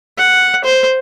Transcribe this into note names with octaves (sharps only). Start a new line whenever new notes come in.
F#5
C5